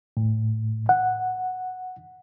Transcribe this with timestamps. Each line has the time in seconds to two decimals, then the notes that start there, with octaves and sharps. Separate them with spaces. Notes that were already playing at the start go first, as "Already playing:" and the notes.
0.17 A2
0.89 F#5